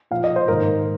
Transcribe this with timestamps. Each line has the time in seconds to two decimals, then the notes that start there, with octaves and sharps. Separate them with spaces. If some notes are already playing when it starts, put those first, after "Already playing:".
0.11 A#2 F3 F5
0.24 D#5
0.36 C5
0.48 G#2 D#3 A#4